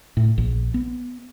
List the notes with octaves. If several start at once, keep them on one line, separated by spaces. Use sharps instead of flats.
A2
A#1
B3